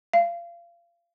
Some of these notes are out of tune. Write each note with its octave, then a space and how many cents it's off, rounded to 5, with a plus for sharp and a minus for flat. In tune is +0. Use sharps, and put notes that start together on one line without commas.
F5 -30